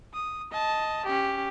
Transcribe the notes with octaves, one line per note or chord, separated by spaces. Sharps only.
D#6
D#5 A5
C#4 G4